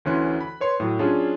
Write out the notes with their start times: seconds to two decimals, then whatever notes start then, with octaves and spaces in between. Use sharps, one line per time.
0.05 D2 E3 C#4 C6 F#6
0.41 B5
0.61 B4 C#5 C6
0.80 A2 F#3
0.99 F#3 C#4 D4 F4 G#4